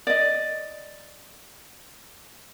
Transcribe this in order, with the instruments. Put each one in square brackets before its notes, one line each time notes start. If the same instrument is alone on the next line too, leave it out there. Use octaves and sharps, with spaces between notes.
[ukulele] D5 D#5